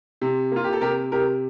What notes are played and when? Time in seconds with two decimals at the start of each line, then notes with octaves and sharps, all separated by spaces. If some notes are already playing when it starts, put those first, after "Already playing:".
0.21 C3
0.52 A#3 F4
0.64 G4
0.73 A4
0.81 C3 G4 A#4
1.12 C3 G4 A#4